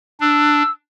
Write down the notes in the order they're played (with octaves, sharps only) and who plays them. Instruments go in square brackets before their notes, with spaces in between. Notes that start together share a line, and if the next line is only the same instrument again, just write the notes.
[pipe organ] D4 [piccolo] E6